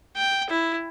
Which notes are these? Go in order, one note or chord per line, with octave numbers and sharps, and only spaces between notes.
G5
E4